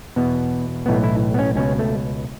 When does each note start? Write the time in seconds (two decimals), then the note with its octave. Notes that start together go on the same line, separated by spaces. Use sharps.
0.16 E2 B2 B3
0.86 B1 A2 E3 B3
1.04 E4
1.34 B3
1.39 C#4
1.56 C#2 B2 C#4
1.79 A3